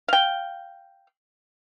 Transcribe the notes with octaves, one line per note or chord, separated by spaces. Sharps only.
F5 G5